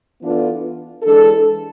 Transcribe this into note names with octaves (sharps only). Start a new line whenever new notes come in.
E3 B3 D4 F4 A4
E3 G#3 D4 A4